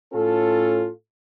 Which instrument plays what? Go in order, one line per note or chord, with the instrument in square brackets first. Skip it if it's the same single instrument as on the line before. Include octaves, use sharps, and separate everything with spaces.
[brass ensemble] A2 C#4 F4 A4